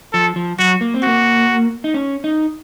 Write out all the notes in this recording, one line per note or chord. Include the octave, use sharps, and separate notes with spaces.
F3 A4
F3
F#3 F#4
A#3
C4
A#3 F#4
D#4
C#4
D#4